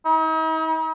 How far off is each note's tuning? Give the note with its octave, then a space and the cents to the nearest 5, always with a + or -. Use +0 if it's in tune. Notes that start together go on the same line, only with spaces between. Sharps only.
D#4 +45